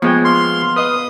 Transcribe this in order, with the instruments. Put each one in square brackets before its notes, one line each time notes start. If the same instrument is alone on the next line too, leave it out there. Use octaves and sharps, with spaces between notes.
[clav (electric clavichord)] F3 G#3 G5 [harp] B3 [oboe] C#5
[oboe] F5 [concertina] C6
[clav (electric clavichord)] B4 D#5 [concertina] D#6